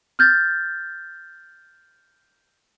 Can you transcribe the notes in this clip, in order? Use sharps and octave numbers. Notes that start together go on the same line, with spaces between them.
F6 G6 A6